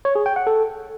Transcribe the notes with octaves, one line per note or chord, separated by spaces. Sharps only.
C#5
G#4
G5
F#5
A4